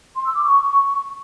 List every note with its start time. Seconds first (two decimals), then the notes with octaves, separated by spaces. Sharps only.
0.16 C6
0.26 E6
0.35 D6
0.44 C#6